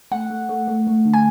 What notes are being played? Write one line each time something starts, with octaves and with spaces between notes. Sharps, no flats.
A3 F#5
A3
A3
A3
A3
D3
G#5